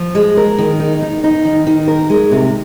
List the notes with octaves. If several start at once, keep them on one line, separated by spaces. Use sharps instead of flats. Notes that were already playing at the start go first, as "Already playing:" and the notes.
Already playing: F3
G#3
A#4
D#3
D#4
D#4
D#4
D#3
D#3
A#4
G#3
C3